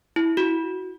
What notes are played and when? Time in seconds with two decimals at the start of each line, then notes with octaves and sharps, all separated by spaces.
0.16 E4
0.37 F#4